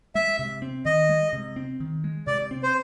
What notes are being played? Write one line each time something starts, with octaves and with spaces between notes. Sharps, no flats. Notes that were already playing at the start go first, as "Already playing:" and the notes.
G#3 E5
C3
C4
D#3 D#5
G#3
C3
C4
D#3
G#3
C3 D5
C4
C5